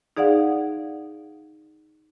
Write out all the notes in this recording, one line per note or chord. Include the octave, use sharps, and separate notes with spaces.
D#4 G#4 D5 F5 F#5